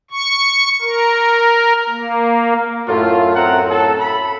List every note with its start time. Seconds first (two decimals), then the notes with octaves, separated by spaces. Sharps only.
0.11 C#6
0.82 A#4
1.89 A#3
2.88 F#2 A2 A3 F4
3.36 C4 F#5 A#5
3.70 A4
4.00 B5